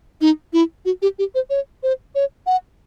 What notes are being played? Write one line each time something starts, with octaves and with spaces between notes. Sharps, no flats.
D#4
E4
F#4
G4
G4
C5
C#5
C5
C#5
F#5